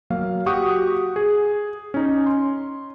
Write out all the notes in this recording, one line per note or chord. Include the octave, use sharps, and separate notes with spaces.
F#3 A#3 F5
F#4 G4 F#5 C#6 D#6
G#4
C#4 D#4
C6